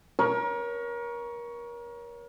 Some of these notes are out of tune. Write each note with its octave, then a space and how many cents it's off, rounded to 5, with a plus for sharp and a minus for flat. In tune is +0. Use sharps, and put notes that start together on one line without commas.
A#4 +30 C#5 +10